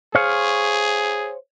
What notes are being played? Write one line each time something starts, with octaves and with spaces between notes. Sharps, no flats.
G#4 C5 C#5 F5